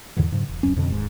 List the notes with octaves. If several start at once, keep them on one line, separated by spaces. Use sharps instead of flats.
E2 G#2 D3 E3
G#2 C#3 F#3
E1
D1 F#2 F#3 C#4
F2 B2 D3
D#1 G#2